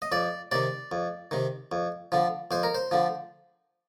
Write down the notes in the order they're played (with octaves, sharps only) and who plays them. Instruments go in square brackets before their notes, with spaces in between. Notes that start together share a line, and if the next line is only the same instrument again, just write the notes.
[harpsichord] D#5
F2 D5
C3 D#3 D5
F2
C3 D#3
F2
D3 F3
F2 C5
A#4
C5
D3 F3